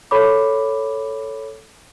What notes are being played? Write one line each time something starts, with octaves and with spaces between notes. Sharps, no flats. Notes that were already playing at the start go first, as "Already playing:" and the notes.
A4 C#5 B5 D6